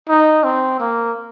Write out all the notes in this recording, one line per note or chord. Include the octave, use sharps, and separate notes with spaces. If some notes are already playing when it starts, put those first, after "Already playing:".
D#4
C4
A#3